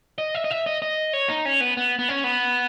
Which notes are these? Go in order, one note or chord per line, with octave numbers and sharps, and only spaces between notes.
D#5
E5
D#5
E5
D#5
D#5
C#5
D#4
C#4
B3
B3
B3
C#4
B3